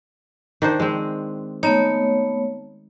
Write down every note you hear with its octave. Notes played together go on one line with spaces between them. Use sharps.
D#3 D4 C5
G#3 C4
A3 B3 D#4 C#5